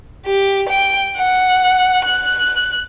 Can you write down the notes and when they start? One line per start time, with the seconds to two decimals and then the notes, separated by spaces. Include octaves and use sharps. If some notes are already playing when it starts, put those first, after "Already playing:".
0.26 G4
0.69 G5
1.16 F#5
2.05 F#6